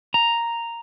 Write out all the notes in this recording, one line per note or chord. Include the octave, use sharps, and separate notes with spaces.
A#5